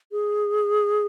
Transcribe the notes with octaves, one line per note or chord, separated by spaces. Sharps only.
G#4